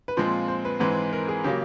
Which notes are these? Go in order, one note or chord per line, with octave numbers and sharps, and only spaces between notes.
B4
A#2 F3 G#3 C4 C5
C5
B4
G#2 E3 G#3 C4 B4
A#4
G#4
C#3 F#3 A#3 G4